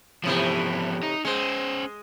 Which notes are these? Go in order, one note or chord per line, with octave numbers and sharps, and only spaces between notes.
A2 C3 E3 F3 B3
D#4
G#3 C#4 C5